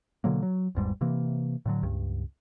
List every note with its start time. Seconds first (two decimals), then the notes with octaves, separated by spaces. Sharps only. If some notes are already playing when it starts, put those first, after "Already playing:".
0.24 B2 D3 F#3 A#3
0.43 F#3
0.75 G#1 E2 G#2 G3
1.01 C3 E3 A#3
1.66 A2 D3 F#3
1.83 C#2 G2